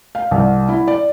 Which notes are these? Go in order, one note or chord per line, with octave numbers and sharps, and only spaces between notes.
F5
C2
E4
D5